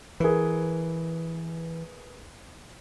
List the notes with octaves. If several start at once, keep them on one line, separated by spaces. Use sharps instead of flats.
E3 G#4 A#4 B4